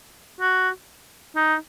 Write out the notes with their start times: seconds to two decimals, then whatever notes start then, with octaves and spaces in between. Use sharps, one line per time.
0.41 F#4
1.36 D#4